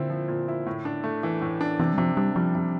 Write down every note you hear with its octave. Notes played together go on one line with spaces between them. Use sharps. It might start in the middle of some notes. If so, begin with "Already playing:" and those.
Already playing: A#2 D3 C4 E4
F3
A#2
E4
A2
D4
A3
E3
A2
D4
C3 E3
G3
C3 F3
G3 D4
F3 G3
C3